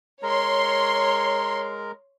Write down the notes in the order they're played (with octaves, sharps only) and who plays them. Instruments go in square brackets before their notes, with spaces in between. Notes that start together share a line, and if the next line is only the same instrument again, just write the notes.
[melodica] G#3 A#4 A#5 [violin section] C#5 C6